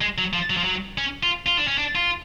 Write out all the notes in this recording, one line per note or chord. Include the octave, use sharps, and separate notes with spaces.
G#3
F#3
F3
F#3
F3
F#3
C#4
F4
F4
D4
C#4
D4
F4